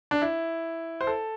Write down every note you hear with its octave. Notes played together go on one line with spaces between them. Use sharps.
D4
E4
C5
A4